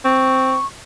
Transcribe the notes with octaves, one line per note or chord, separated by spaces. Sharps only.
C4 C#6